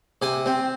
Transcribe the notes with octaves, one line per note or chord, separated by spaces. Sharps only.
C3 G#5
C4